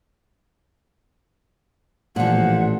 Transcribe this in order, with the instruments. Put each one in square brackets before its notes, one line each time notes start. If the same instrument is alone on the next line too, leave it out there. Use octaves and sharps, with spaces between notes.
[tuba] A1 [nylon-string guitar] A#2 F3 [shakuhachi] F#5